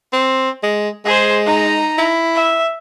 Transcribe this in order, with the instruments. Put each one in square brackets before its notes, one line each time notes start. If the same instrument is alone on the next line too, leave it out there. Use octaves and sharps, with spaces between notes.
[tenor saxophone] C4
G#3
[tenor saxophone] G#3 [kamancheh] G#4 C5
[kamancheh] D#4 A#5
[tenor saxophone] E4
[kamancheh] E5